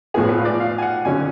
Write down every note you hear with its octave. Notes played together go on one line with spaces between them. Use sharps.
A2 F3 B3 G#4
B4
F5
D5
F5
G#5
F#5
F2 D3 F#3 C#4 G#5